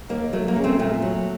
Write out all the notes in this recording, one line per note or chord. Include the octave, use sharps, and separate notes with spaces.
D#2 A#3
F#3 A3
A#3
C#3
A3 C4
A#2 A3
F#3